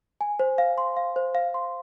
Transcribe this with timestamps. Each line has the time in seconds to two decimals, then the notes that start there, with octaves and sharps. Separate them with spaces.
0.21 G#5
0.39 C5
0.58 F5
0.78 C6
0.97 F5
1.16 C5
1.35 F5
1.54 C6